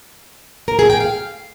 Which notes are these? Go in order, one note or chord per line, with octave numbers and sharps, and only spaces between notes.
A#4
G#4
G5
F5